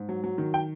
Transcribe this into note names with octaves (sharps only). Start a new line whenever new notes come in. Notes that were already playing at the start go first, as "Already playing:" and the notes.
Already playing: G#2
F#3
F#3
D#3
G5